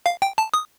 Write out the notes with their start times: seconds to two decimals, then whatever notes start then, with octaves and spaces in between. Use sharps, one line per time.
0.06 F5
0.22 G5
0.38 A5
0.54 D#6